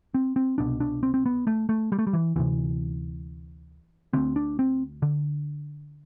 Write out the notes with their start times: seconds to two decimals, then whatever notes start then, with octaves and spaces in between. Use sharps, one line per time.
0.14 C4
0.36 C4
0.58 C2 B2 D4
0.80 D4
1.03 C4
1.14 C4
1.26 B3
1.47 A3
1.69 A3
1.92 G3
1.99 A3
2.07 G3
2.13 E3
2.36 D2 C3 E3
4.13 D2 D3 C4
4.36 D4
4.59 C4
5.02 D3